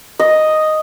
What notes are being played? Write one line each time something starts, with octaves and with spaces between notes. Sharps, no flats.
D#5